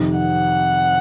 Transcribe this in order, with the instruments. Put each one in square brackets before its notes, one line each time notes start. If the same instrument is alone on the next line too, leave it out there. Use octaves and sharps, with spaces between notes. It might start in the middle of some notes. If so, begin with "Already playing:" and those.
Already playing: [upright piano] F2 C3 D#3
[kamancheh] F#5